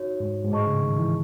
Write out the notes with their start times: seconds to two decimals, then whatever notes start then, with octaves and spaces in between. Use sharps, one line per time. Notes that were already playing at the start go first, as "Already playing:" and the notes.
Already playing: D#4 F#4 C#5
0.20 G#2
0.44 G#2
0.51 A2 G#4 D#5 A5 C#6
0.67 C#3
0.82 D#3
0.98 E3